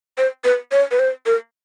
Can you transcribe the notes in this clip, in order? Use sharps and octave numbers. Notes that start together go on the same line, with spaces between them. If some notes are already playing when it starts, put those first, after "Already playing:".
C5
B4
C#5
B4
C5
A#4